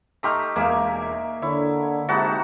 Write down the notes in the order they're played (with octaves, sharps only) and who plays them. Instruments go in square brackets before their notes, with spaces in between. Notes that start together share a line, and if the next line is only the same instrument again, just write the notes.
[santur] A3 D#4 G4 [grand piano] A#5 C6 F6
[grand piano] E1 G#3 A#4 [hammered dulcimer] A#3 E5 [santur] G#5
[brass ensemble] D3 [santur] E4 [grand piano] C#5
[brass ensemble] G#2 [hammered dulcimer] C3 D#4 E4 [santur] F#4 F#5 A5